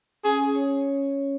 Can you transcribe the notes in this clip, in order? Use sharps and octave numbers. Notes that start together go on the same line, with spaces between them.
C#4 G#4
C#4
C#5